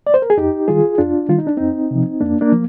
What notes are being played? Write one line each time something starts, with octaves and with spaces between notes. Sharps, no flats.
D5
C5
A#4
G#4
F2 D#4 G4
D#3 G3 F4 G#4
F2 D4 F4
D#3 G3 F4
D#4
D4
F2 C4 D#4
C3 F3
F2 A#3 D4
A#3 D4
F3